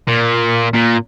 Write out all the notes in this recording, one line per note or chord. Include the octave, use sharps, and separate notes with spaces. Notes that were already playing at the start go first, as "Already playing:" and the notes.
A#2
A#2